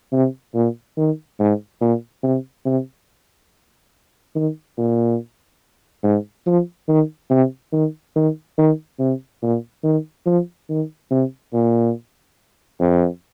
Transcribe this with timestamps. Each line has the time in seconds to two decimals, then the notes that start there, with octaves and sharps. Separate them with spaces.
0.12 C3
0.54 A#2
0.97 D#3
1.39 G#2
1.81 A#2
2.23 C3
2.65 C3
4.35 D#3
4.78 A#2
6.04 G#2
6.46 F3
6.88 D#3
7.30 C3
7.73 D#3
8.16 D#3
8.58 D#3
8.99 C3
9.43 A#2
9.84 D#3
10.26 F3
10.69 D#3
11.10 C3
11.53 A#2
12.80 F2